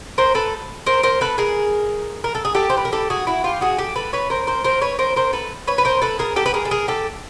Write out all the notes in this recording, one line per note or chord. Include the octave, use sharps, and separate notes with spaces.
A#4 C5
A4 B4
A#4 C5
A#4 C5
A4 B4
G#4 A#4
A#4
A4
G#4
G4 A4
C5
B4
A#4
G4 A4
F#4 G#4
E4 F#4
F4 G4
F#4 G#4
G4 A4
A4 B4
B4 C#5
A#4 C5
A#4 C5
A#4 C5
B4 C#5
A#4 C5
A#4 C5
A4 B4
B4 C#5
B4
A#4 C5
A4 B4
G#4 A#4
G4 A4
B4
G#4 A#4
A4
G#4 A#4
G4 A4